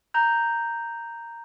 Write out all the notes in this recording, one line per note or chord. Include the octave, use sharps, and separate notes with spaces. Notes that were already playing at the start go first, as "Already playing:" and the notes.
A#5 G6